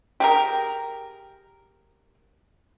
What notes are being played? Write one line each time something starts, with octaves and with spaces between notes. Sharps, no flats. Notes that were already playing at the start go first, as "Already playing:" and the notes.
G4 G#4 A#4